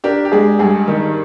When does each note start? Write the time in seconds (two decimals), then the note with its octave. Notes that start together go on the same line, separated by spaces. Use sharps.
0.04 D4 G4 A#4
0.25 G4
0.32 G#3 G#4
0.59 G2 G#4
0.88 D#3 G4